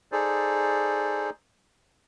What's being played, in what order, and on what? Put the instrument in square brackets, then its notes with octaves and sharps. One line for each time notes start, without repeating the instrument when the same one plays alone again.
[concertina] D#4 G#4 A4 C5 D5